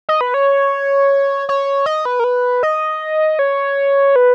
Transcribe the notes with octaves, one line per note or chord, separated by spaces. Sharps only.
D#5
B4
C#5
C#5
D#5
B4
A#4
B4
D#5
C#5
B4